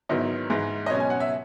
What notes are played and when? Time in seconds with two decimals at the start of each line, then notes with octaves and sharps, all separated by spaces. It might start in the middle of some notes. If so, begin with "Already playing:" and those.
0.09 G#2 D#3 F#3 B3 E4 D#5
0.50 G#2 E3 G#3
0.86 D#5
0.90 B2 F#3 C#4 C#5
1.00 G#5
1.10 F#5
1.20 E5